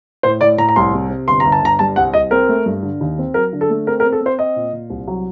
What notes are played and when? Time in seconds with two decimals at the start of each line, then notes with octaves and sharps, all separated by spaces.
0.23 A2 C5
0.41 A2 D5
0.58 A2 A#5
0.69 A#5
0.76 C2 C6
0.94 C3
1.10 C3
1.28 G1 C6
1.40 G1 A#5
1.52 A5
1.62 G1 A#5
1.79 G3 A5
1.96 C2 F#5
2.13 C2 D#5
2.31 C4 A#4
2.49 A3
2.66 G2
2.83 D3
3.01 D#2
3.18 C4
3.34 F#3 A#4
3.53 D3
3.61 A4
3.70 A3
3.87 C4 A#4
4.00 A#4
4.05 C4
4.12 A4
4.21 C4 C5
4.38 C4 D#5
4.56 A#2
4.73 A#2
4.90 C2
5.08 F#3